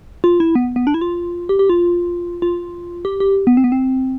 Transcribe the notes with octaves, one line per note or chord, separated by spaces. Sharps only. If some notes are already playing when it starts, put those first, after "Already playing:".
F4
E4
B3
B3
D4
E4
F4
G4
G4
F4
F4
G4
G4
B3
C4
B3
C4